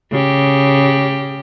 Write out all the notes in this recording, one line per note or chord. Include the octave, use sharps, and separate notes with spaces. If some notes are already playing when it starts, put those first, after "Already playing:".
C#3 G4